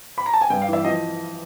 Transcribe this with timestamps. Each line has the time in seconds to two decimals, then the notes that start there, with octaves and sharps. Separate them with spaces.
0.18 B5
0.26 A#5
0.34 A5
0.41 G#5
0.50 G2 G5
0.62 F5
0.68 E3
0.73 E5
0.84 F3 D#5